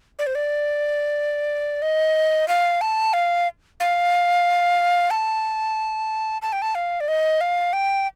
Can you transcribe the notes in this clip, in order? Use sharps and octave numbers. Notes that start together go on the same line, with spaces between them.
D5
C5
D5
D#5
F5
A5
F5
F5
A5
A5
G5
A5
F5
D5
D#5
F5
G5